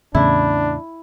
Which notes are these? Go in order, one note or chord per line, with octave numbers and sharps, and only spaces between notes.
E2 A2 C#3 D4 E4